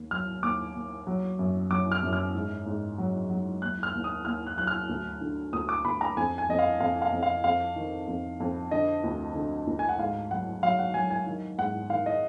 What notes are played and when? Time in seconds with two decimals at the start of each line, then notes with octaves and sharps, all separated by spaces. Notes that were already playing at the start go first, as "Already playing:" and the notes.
Already playing: D#2
0.11 F#3 F6
0.43 D#2 D6
0.75 D#2
1.07 F#3
1.39 F#2
1.71 F#3 D6
1.92 F6
2.03 F#2
2.13 F6
2.34 G#2
2.66 G#2
2.98 F#3
3.30 F#3
3.62 D#2 F#6
3.83 F6
3.94 D#2
4.04 D#6
4.25 D#2 F6
4.47 F#6
4.57 F#3 F#6
4.67 F6
4.89 D2
5.21 D3
5.53 D2 D#6
5.69 D6
5.85 D2 B5
6.01 A#5
6.17 F2 G#5
6.38 G#5
6.49 F2 D#5
6.59 F5
6.80 F2 F5
7.02 F5
7.12 F2
7.23 F5
7.44 F2 F5
7.76 D#3
8.07 F2
8.40 F2
8.71 D3 D#5
9.04 D2
9.35 D3
9.67 D2
9.79 G#5
9.89 F#5
9.99 G#2 F5
10.31 F#3 F#5
10.63 F#3 F5
10.79 F#5
10.94 F#3 G#5
11.10 G#5
11.26 D#3
11.58 G#2 F#5
11.90 D#3 F5
12.06 D#5